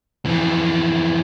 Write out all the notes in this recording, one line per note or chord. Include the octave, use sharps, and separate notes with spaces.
F2 E3